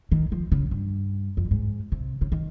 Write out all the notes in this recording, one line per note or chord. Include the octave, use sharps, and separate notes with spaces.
D#3
F3
C#3
G2
F2
G2
G#2
C3
C#3
D#3